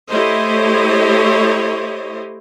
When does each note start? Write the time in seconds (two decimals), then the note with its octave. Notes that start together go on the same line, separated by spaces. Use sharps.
0.11 A3 E4 G4 C5 C#5 D#5